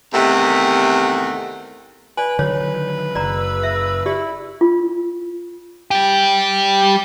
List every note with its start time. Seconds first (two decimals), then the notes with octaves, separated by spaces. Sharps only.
0.14 E2 C3 D#3 A3 F#5
2.17 B4 D5 G#5
2.39 D3 D#3 F#3 B4 C#5
3.15 F#1 C#3 D5 A#5 E6
3.63 E5
4.06 E4 G4 D5
4.61 F4
5.91 G3 G4